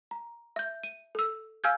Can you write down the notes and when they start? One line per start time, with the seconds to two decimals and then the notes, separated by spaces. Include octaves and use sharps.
0.11 A#5
0.56 E5 G6
0.84 D#7
1.15 A4 E6
1.64 F5 G#5 E6 F6 G6 G#6